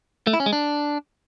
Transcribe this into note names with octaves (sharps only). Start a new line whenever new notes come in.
A3
E4
C#4
G#3
D4